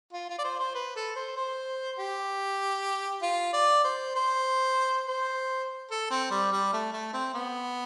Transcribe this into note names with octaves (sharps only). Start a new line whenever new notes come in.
F4
F4
D5
C5
C5
B4
A4
C5
C5
G4
F4
D5
C5
C5
C5
A4
C4
G3
G3
A3
A3
C4
B3